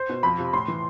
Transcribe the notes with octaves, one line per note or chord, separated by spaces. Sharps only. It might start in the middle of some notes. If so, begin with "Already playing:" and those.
Already playing: C5
B2
F2 B5
C3 F3
A2 C6
E3